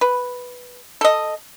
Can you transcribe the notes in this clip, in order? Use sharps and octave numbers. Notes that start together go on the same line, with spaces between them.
B4
A4 D#5